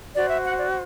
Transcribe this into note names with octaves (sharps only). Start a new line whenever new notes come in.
F#4 C5 D5
E5
F#5
D5